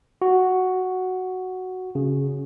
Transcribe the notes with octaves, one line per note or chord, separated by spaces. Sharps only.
F#4
C#3